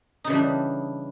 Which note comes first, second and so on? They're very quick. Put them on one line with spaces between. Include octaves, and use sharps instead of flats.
D#4 C#3 E3 G3 D4